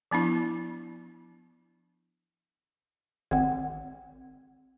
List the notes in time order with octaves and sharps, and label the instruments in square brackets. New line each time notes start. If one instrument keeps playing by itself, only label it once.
[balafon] F3 B3 D4 E4
[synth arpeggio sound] G#1 [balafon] C4 F#5